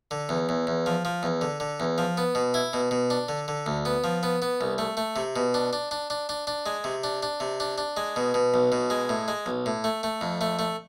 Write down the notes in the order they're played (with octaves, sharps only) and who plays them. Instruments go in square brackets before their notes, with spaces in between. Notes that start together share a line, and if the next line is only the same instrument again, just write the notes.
[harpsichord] D3
E2
E2
E2
F3
F3
E2
D3
D3
E2
F3
B3
B2
E4
B2
B2
D4
D3
D3
D2
B3
F3
B3
B3
C2
A3
A3
C3
B2
D4
D4
D4
D4
D4
D4
G#3
C3
D4
D4
C3
D4
D4
G#3
B2
B2
B1
B2
G#3
A2
G#3
B1
A2
A3
A3
F2
A3
A3